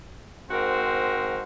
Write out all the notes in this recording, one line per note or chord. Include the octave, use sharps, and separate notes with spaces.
G#2 C4 F#4 A#4 C5